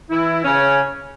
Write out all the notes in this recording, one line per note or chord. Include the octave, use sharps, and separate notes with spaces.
E3 E4
C#3 C#4